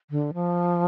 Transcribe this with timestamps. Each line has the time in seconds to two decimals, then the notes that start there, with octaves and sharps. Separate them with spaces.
0.10 D3
0.34 F3